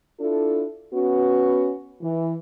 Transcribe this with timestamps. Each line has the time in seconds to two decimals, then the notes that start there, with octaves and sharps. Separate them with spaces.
0.20 D4 E4 F4 A4
0.92 B3 C#4 F#4
2.01 E3